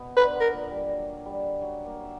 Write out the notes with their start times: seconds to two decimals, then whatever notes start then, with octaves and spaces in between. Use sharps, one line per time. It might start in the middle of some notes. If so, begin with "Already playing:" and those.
Already playing: B2 B3
0.17 D3 D4 B4
0.34 B2 B3
0.40 A#4
0.52 A#2 A#3
0.71 G3
0.89 F#3
1.26 G3
1.61 F#3 F#4
1.86 A#3 A#4
2.03 E5